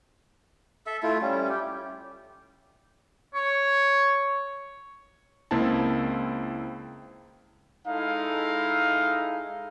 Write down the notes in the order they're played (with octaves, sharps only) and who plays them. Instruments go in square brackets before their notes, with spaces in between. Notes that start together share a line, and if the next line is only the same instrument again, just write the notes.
[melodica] A4 E5
A3 E4 F4
G3 C#4
G4
[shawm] C#5
[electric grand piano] C#2 A#3 C4 E4 A5
[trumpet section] G#3 D#4 E4 A4 F5